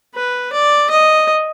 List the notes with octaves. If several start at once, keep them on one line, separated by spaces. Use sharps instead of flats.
B4
D5
D#5